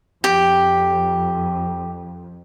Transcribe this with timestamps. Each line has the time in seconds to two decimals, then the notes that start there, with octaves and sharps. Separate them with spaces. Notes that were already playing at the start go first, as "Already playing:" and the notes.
0.24 F2 G4